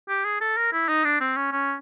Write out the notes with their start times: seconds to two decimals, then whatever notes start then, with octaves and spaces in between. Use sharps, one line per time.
0.09 G4
0.25 G#4
0.41 A4
0.57 A#4
0.73 E4
0.88 D#4
1.04 D4
1.20 C4
1.37 C#4
1.52 C#4